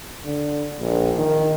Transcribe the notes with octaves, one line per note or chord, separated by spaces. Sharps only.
D3
A#1
D#3